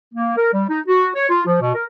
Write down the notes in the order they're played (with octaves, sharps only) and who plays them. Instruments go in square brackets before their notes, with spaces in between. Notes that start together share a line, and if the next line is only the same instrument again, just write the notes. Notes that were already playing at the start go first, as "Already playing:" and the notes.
[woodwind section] A#3
A#4
G3
D#4
F#4
C#5
F4
F3
B2
A#4